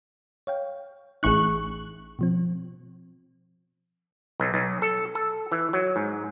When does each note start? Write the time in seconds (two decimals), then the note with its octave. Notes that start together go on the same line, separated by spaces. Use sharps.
0.47 C#5 F5 G5
1.23 A1 D#4 G#4 C#6 F#6
2.19 B2 F3 C4
4.40 B1
4.54 B1
4.82 A4
5.15 A4
5.52 E3
5.73 F#3
5.96 G#2